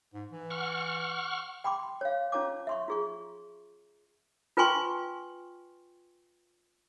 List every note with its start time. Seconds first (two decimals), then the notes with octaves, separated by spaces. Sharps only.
0.14 G#2
0.32 E3
0.50 F#5 C#6 F6
1.64 G5 B5 C6 D6
2.01 C#5 F5
2.32 C#4 F4 C#5 A5 D6
2.67 E5 C6 C#6
2.88 F4 G#4 C#6
4.57 F4 B4 G5 G#5 C6 C#6